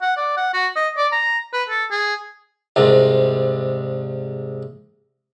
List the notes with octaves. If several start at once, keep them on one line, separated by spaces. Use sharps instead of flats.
F#5
D5
F#5
F#4
D#5
D5
A#5
B4
A4
G#4
C2 G#2